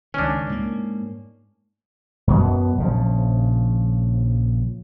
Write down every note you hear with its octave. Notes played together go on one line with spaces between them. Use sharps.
C#2 D#3 C#4 D4
G#2 A#3
F#2 B2 B3
A#1 C#3 F3